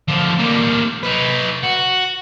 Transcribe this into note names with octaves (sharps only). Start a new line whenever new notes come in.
D3 F3
G3 A#3
D#4 B4
F#4